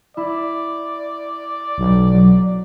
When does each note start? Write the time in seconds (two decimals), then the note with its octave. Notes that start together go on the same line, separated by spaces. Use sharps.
0.17 E4 D5
1.78 B1
2.14 F#3 D6